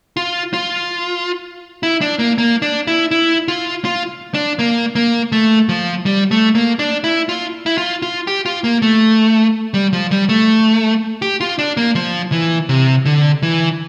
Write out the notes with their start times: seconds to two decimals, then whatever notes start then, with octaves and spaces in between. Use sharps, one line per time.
0.17 F4
0.53 F4
1.83 E4
2.01 D4
2.19 A#3
2.38 A#3
2.62 D4
2.87 E4
3.11 E4
3.48 F4
3.85 F4
4.34 D4
4.59 A#3
4.95 A#3
5.32 A3
5.69 F3
6.06 G3
6.31 A3
6.55 A#3
6.79 D4
7.04 E4
7.29 F4
7.66 E4
7.78 F4
8.02 F4
8.27 G4
8.46 F4
8.64 A#3
8.82 A3
9.74 G3
9.93 F3
10.11 G3
10.29 A3
11.22 G4
11.41 F4
11.59 D4
11.77 A#3
11.95 F3
12.32 E3
12.69 C3
13.05 D3
13.43 E3